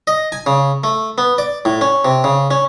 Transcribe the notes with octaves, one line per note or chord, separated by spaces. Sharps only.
D#5
G#5
C#3
A3
B3
D5
A2
C#4
C3
C#3
C#4